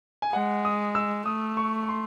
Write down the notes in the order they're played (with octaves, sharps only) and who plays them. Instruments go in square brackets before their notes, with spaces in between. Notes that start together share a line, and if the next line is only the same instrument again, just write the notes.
[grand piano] G#5
[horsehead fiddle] G#3 [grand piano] F#5
[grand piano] D#6
E6
[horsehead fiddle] A3 [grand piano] D#6
[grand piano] C#6
C#6
C6